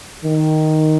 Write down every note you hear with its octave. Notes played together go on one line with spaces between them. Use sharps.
D#3